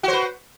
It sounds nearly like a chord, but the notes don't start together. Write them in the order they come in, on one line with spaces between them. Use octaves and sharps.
F#4 C5 B4